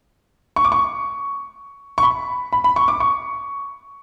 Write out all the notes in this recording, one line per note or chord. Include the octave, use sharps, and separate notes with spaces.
C#6
D6
C#6
C#6
B5
B5
B5
C#6
D6
C#6